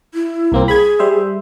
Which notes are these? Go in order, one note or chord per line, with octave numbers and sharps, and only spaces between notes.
E4
C2 A#3 C4
G#4 B5 G#6
G3 C5 E5